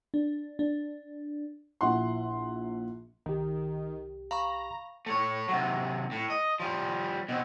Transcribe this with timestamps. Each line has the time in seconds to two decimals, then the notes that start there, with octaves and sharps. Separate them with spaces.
0.14 D4
0.59 D4
1.81 A#1 E4 F#5 C6
3.26 C2 D#3 G4
4.31 F5 A#5 B5 C#6
5.06 A3 C#5
5.49 C3 F#3
6.11 A2
6.30 D#5
6.60 F3 G3
7.29 B2 C4